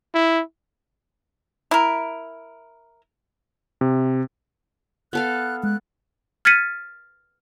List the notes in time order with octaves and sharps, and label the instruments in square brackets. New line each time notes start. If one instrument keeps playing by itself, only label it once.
[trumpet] E4
[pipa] E4 A#4
[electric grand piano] C3
[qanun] B3 A4 F5 [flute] F#6
[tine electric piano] G#3 [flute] F#6
[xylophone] F6 G#6 A6 B6 C#7 D#7